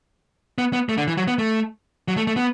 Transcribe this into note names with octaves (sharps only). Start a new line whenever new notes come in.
B3
B3
A3
D3
E3
F#3
B3
A3
F#3
A3
A3
B3